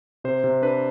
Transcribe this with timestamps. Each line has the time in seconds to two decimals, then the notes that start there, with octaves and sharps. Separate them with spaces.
0.24 C3 C5
0.44 C3
0.62 D4 B4